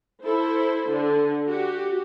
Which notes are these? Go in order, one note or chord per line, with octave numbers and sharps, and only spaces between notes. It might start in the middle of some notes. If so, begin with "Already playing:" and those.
E4 A4 C5
D3
F#4 G4